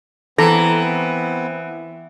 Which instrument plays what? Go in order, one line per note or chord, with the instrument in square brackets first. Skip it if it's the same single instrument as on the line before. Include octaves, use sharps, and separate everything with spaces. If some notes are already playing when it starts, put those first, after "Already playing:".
[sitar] E3 [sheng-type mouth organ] B3 C4 [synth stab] A4 A#5